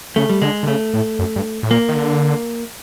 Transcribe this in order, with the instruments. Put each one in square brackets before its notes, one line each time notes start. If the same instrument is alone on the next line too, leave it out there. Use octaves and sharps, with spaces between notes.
[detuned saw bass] C#3 [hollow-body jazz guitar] A3
[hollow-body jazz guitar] G3
[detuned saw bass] D3 [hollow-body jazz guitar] G#3
[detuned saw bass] D3
[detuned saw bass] C#3 [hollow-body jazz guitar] A3
[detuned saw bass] A2
F#2
G2
A2
[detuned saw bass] A#2 [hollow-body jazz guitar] A#3
[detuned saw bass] D#3
D3